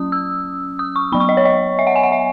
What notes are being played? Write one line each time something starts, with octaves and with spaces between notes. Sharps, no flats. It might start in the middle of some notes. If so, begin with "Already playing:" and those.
Already playing: F#3 C#4 D#6
E6
D#6
C#6
F#3 B3 B5
C#6
D#5
C#5
D#5
E5
F#5
G#5
F#5
E5